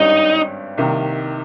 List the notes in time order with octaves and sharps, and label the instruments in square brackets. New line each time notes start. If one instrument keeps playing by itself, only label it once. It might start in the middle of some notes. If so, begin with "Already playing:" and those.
Already playing: [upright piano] G#1 G2 G3 C#4 [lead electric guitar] D#4
[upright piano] C2 C3 D#3 A#3